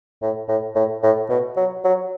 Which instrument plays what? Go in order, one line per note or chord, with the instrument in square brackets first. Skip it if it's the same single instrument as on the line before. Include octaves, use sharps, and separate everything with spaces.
[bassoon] A2
A2
A2
A2
B2
F#3
F#3